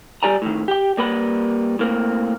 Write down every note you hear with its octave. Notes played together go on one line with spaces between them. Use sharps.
G3 G4 D5 G#5 A#5
A2 D#3
G4 G5
G3 A#3 B4 B5
A2 A#3 C4